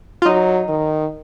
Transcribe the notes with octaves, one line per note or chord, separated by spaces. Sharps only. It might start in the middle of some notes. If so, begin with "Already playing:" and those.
F4
F#3 D#4
D#3